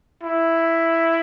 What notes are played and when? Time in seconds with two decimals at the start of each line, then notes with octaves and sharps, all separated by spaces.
0.23 E4